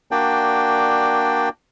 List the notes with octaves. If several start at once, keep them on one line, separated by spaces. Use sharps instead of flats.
A#3 D4 F#4 D5 G5